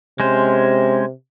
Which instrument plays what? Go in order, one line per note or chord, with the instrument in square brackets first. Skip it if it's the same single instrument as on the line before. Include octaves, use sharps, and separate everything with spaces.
[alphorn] C3 [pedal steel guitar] G#3 C#4 C5